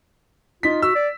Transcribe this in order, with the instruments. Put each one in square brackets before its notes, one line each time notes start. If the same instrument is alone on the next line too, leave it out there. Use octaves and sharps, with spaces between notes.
[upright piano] D#4 B6 [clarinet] F4
[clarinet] F#4 [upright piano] E6
[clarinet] D5